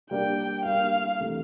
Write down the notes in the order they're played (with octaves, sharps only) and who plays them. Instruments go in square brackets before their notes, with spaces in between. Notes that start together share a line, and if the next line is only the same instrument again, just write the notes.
[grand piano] G3 A#3 D4 G4 A#4 [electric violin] G5
[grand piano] G3 A#3 D4 G4 A#4 [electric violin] F5
[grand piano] E3 A3 C4 G4